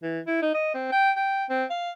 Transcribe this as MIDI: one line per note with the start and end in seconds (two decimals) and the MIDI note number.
0.03 0.20 52
0.27 0.39 64
0.42 0.51 63
0.54 0.74 75
0.74 0.90 60
0.92 1.11 79
1.16 1.44 79
1.50 1.65 60
1.70 1.91 77